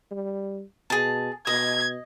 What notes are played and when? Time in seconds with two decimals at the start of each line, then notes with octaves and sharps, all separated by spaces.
0.11 G3
0.90 B2 G#4 A5
1.47 B2 D#5 G#6